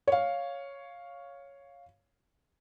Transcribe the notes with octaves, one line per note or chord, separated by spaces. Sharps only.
C#5 F5